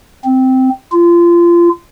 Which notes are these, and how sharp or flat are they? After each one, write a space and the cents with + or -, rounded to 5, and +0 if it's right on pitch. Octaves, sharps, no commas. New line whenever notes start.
C4 -10
F4 -25